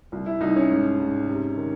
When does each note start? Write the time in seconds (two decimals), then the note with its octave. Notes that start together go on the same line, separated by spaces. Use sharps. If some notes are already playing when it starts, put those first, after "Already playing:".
0.12 C2
0.26 E4
0.41 C2 D#4
0.56 C#4
0.71 G#2
1.00 G#2
1.28 C3
1.57 D#3